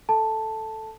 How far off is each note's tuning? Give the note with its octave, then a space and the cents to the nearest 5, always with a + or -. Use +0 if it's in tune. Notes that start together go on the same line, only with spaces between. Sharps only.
A4 +0 A5 +0